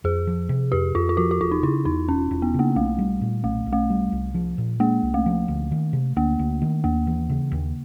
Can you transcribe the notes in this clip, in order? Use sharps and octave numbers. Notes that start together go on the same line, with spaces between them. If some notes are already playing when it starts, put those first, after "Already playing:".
F2 G#4
F3
C3
F2 G4
F2 F4
F4
F3 F#4
F#4
E1 F4
D#4
C#3 E4
E2 D#4
E1 C#4
E1
B3
C#3 A#3
B1 A3
G3
A#2
B1 A3
B1
A3
G3
C2
F3
A#2
G#3 A#3
C2
A3
F3
D2
D#3
C3
D2 A#3
D2
D#3
D#2 A#3
E3
C#3
D#2